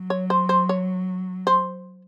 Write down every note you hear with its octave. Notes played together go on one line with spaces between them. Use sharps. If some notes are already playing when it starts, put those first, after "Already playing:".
Already playing: F#3
C#5
C5
C5
C#5
C5